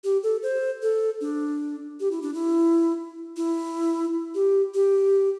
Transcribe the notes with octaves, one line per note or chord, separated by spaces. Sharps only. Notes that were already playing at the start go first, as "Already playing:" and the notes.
G4
A4
C5
A4
D4
G4
E4
D4
E4
E4
G4
G4